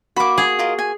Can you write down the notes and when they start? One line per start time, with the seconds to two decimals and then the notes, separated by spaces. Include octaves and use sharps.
0.16 A#3 F#4 B5 D6
0.38 G#4
0.59 F4 A#4 D#5
0.79 G#5